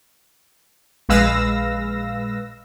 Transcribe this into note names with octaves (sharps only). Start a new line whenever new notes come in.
A#1 G#3 B4 F5 E6 A#6